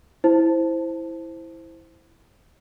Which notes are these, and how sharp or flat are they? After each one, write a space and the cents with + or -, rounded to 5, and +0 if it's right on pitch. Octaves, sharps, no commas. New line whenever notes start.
E4 -5 C5 +0 A5 +0